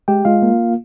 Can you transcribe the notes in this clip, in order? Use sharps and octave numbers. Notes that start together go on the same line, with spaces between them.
G#3 G4 G5
G#3 F4 F5
A#3